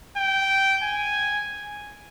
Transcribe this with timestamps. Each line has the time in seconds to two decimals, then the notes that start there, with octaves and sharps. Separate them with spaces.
0.17 G5
0.83 G#5